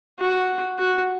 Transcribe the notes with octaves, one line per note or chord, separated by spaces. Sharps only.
F#4
F#4